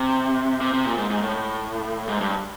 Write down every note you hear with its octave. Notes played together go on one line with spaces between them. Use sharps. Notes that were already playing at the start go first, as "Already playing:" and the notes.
Already playing: C3
C3
C3
A#2
G#2
G#2
A2
G#2
G2